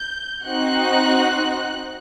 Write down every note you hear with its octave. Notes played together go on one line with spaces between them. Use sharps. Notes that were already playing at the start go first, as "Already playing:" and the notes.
Already playing: G6
C4 D#4 F#4 F#6